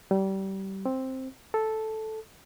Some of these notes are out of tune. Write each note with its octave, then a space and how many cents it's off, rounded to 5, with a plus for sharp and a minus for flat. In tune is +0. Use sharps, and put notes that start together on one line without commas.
G3 -25
C4 +5
A4 -5